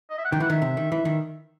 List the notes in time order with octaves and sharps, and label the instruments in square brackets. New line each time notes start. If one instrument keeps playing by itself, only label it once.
[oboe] D#5
E5
F#5
[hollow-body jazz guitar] D#3 [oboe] G5
[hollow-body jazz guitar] E3 [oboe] F#5
[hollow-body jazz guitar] D#3 [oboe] E5
[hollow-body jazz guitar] C3
D#3
[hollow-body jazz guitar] E3 [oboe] E5
[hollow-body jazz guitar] D#3